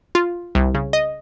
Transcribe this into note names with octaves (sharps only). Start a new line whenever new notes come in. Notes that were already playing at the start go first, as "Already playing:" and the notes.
F4
C2
C#3
D#5